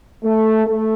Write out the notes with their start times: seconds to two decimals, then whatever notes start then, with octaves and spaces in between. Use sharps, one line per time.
0.23 A3
0.66 A3